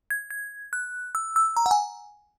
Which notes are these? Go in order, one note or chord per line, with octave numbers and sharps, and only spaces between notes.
G#6
G#6
F#6
E6
E6
A#5
F#5
G#5